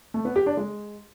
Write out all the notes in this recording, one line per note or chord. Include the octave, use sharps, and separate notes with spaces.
A3
B3
G4
D4
G#3